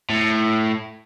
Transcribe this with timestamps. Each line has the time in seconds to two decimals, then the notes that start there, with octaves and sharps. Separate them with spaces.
0.10 A2